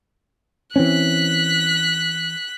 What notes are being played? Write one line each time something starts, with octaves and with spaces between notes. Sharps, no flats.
E3 C4 C#4 F#6 B6